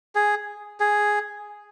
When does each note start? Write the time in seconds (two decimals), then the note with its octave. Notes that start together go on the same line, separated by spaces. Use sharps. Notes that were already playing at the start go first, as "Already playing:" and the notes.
0.15 G#4
0.80 G#4